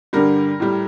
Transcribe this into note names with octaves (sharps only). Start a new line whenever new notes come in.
G2 D3 G3 A#4
A2 G3